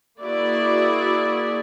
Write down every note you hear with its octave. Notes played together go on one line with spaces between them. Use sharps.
A#3 E4 F#4 G#4 D5